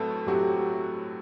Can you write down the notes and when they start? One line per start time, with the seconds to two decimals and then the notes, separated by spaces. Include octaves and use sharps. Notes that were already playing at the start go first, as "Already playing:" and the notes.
Already playing: A2 F#3 A3 C4 F#4 A4 B4
0.27 A2 F#3 A3 C4 F#4 G4